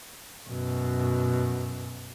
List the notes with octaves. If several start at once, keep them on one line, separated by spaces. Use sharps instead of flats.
F#2 B2